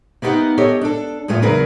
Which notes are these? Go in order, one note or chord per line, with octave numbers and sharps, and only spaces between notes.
A#3 B3 D#4 F4 G4 F#5
G4 A4 C#5 D#5
D4 A4
E2 A2 G#3 A3 F4
E2 C#3 F#3 G#4 A#4 B4